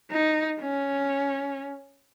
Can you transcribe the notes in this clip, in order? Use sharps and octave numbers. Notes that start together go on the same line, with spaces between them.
D#4
C#4